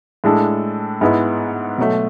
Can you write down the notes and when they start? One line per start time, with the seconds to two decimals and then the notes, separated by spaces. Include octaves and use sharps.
0.24 A2 G#3 D4 A4
1.01 G#2 G#3 B3 E4
1.78 B2 F#3 A3